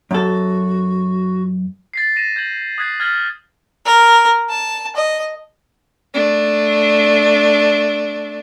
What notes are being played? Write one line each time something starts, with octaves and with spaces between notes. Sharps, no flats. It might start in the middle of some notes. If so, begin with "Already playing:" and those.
F#2 F#4 A4
A6 B6 C7
A#6 B6 D#7 E7
G6 G#6 F#7
D#6 F#6 G#6 B6 C7
F6 G#6 A6 B6 F#7 G7
A#4
A5
D#5
A3 D4